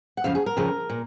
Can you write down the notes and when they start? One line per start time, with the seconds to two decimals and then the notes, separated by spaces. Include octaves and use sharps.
0.17 F#5
0.24 F2 C#3 F3 F5
0.35 G#4
0.46 A#4
0.57 F2 C#3 F3
0.90 A#2